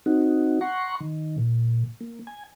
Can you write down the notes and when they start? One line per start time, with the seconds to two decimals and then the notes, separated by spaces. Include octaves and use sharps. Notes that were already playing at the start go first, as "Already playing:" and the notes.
0.06 C4 D#4 F#4
0.61 F#5 A#5 C6 C#6
1.00 D#3
1.38 A#2
2.01 A#3
2.27 G#5